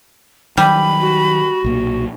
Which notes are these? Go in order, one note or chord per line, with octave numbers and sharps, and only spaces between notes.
D#3 F#3 G3 B5
F#4
B1 A#2 A#3